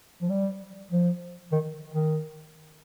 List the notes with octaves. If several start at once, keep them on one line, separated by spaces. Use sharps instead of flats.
F3
G3
F3
D#3
D#3